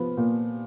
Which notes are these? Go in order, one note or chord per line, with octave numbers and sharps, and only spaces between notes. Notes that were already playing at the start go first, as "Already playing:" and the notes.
Already playing: F3 B3
A#2